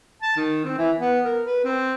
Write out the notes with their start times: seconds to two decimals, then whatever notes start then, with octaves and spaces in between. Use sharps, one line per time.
0.22 A5
0.36 D#3
0.65 C4
0.78 E3
0.98 B3
1.25 A#4
1.45 B4
1.65 C4